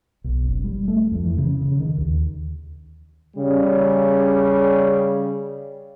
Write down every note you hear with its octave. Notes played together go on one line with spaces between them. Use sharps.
B1
F#1
G3
A3
F2
E3
C#3
C#3
D#3
D#2
C#3 G3